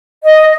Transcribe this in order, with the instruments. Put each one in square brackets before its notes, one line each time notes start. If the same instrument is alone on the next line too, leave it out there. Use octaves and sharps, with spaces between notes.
[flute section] D#5